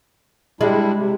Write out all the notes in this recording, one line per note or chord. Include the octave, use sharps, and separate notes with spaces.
G3 G#3 D4 E4
C3